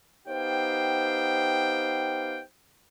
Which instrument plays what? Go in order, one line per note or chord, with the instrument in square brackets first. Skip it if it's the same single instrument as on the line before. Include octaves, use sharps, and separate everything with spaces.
[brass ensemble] B3 D#4 G4 C5 F5 G5